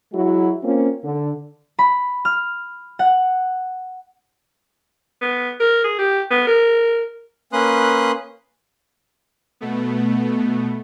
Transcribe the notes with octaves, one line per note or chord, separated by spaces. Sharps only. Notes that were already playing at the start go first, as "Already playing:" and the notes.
F#3 G#3 E4 F#4
A#3 C4 C#4 F4
D3
B5
F6
F#5
B3
A#4
G#4
G4
B3
A#4
A#3 C#4 B4 C6 D#6 F#6
B2 A3 B3